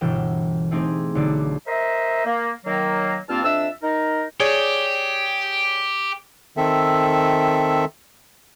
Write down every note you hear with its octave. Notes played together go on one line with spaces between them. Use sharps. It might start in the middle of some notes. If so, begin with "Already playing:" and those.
G1 B2 E3 A#4 G5 E7
A3 C4 D#4 G4 G#4
B1 D3 D#4 D5 E7
A#4 C5 D#5 E5
A#3
D#3 F#3 A#3
G2 A#3 C4 F4 A5 F6
F2 D4 E5 E6
D#4 A#4
G4 G#4 C#5 D5
D#3 C4 A4 E5